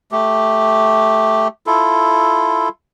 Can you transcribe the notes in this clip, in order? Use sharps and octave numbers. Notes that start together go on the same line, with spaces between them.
A3 G4
E4 F4 A4